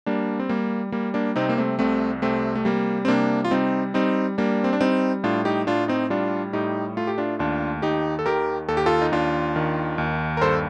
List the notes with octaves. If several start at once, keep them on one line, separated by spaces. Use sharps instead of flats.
G3 A#3 D4
C4
G3 A#3
G3 A#3
A#3 D4
C3 C4 D#4
A#3
A3 C4
C2 A3 C4
C3 A3 C4
A3
G3 A#3
C4
C3 A#3 D4
F4
G3 C4 D#4
G3 C4 D#4
G3 A#3 D4
C4
D4
G3 C4 D#4
A2 D4 F4
D#4 G4
A2 D4 F4
C4 D#4
G3 D4 F4
A2 D#4 G4
A3 F4
G4
D4 F4
D#2 D4 F4
D#2 D#4 G4
A4
D#3 G4 A#4
D#2 A4
G4
F4 A4
D#4
D#2 D4 F4
D#3
D#2
A#4
G2 A4 C5